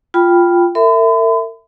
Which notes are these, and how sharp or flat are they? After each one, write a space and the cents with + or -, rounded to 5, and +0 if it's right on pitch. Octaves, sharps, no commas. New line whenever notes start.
F4 +0 G5 +0 B5 +0
A#4 -40 E5 +0 B5 +45